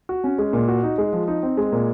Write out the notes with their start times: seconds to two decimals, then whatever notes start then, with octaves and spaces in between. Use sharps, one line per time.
0.09 F#4
0.24 C#4
0.38 G#3
0.53 A#2
0.68 F#4
0.83 D#4
0.98 G#3
1.13 F3
1.28 D#4
1.43 C4
1.57 G#3
1.72 A#2